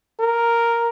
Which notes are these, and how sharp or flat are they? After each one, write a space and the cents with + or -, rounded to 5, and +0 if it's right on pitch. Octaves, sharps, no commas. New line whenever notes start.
A#4 +0